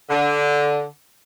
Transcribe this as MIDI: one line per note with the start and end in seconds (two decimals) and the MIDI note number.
0.10 0.85 50